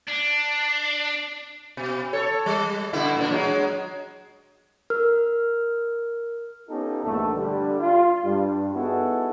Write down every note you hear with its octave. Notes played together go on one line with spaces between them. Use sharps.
D4
B2
A4 C#5
G3
B2 D3 E4
A#2 D4
F#3 G#3
A#4 F6
B3 C#4 D#4 F4 G4 A4
A#1 E2 G2 A3
D3 G3
F4
G2 G3
B3 D#4 E4 F#4 G#4 A4